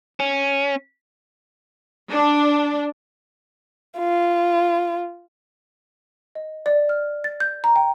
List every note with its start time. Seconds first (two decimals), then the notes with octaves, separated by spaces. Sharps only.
0.20 C#4
2.11 D4
3.98 F4
6.35 D#5
6.66 D5
6.89 F6
7.24 A6
7.40 G6
7.64 A#5
7.76 G5